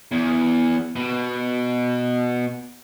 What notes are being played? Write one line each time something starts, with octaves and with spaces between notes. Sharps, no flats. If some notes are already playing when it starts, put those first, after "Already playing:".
E2
B2